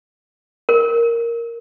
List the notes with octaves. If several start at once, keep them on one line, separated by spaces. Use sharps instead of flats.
A#4